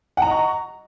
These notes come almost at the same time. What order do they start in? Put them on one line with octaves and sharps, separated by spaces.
F#5 A#5 D#5 C#6